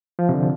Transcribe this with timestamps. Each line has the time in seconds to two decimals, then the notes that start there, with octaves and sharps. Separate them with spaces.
0.19 F3
0.29 C3
0.34 D3